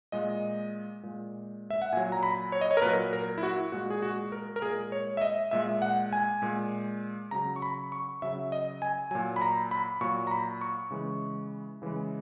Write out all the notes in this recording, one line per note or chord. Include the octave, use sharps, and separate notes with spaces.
A#2 G#3 D#5
A#2 G#3
E5
F#5
A#2 F#3 G#5
A#5
B5
C#5
D#5
C#5
A#4
A#2 F#3 B4
A#4
E4
F#4
A#2 G#3 F#4
G#4
F#4
A#4
A#4
A#2 G#3 G#4
C#5
E5
D#5
A#2 G#3 E5
F#5
G#5
A#2 G#3
C#3 F#3 A#5
C#6
B5
C#6
C#3 F#3 E5
D#5
G#5
A#2 F#3 G#5
B5
A#5
B5
A#2 F#3 C#6
A#5
B5
C#6
C#3 E3 G#3
C#3 E3 G#3